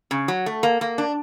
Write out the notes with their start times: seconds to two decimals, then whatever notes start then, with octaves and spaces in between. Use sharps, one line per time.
0.11 C#3
0.28 F#3
0.46 A3
0.63 A#3
0.81 A#3
0.98 D4